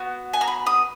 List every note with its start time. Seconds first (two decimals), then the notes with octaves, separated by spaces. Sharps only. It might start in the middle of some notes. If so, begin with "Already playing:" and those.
Already playing: B3 F#4
0.33 G#5
0.41 A#5
0.47 B5
0.67 D#6